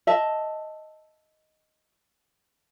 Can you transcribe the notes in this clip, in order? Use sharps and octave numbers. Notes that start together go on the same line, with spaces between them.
D#5 E5 A5